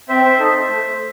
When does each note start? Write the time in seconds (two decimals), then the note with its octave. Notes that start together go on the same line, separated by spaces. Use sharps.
0.09 C4 C5 E5
0.40 D#4 A4
0.69 A3